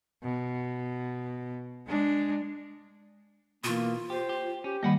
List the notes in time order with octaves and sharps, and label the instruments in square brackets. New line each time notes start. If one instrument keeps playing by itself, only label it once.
[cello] B2
G#3 D4
[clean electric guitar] B2 E3 [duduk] A#3 [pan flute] F4
[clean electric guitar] G4 [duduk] C5
[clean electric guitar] G4
[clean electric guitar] C#4 [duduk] G4
[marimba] D#3 G3 A#3 [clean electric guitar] D#5 F#5 B5